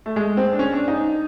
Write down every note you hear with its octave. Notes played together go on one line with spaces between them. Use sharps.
A3
G#3
C4
D4
C#4
D4
D#4